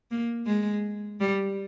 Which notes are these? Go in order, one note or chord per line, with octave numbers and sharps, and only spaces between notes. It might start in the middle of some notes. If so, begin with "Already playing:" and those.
A#3
G#3
G3